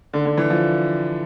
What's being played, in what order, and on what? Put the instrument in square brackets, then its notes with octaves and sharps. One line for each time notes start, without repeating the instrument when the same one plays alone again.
[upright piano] D3
D3
E3
F3